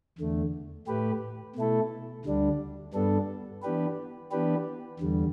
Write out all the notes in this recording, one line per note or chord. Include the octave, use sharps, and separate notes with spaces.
E2 D3 A3
A2 A3 G4 B4
B2 A3 E4 A4
D2 D3 G3 D4
G2 G3 B3 D4 A4
E3 B3 D4 G4 B4
E3 B3 D4 G4 B4
E2 D3 G3